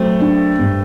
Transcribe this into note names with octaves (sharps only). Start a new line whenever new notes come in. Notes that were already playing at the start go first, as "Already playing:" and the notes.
Already playing: F#3 A3 C4
D4
G2